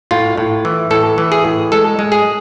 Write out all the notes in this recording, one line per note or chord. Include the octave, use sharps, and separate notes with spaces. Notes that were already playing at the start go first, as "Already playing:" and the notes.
A2 F4
A2
E3
A2 A4
E3
G#4
A2
G#3 A4
G#3
G#4